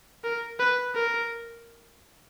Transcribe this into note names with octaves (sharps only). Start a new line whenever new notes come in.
A#4
B4
A#4